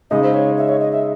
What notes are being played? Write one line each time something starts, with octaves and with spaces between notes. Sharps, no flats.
C#3 G#3 D#4 D#5
C5
C#5
E5
C#5
D#5
E5